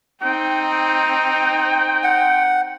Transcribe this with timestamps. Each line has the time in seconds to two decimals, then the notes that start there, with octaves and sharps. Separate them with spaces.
0.22 C4 D#4 G5
2.04 F#5